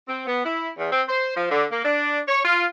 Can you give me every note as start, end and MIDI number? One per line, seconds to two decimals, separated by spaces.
0.08 0.24 60
0.27 0.42 59
0.45 0.69 64
0.78 0.91 40
0.91 1.02 60
1.08 1.34 72
1.36 1.50 53
1.51 1.65 50
1.71 1.81 58
1.84 2.19 62
2.28 2.43 73
2.43 2.65 65